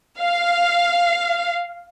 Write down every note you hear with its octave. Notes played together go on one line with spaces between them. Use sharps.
F5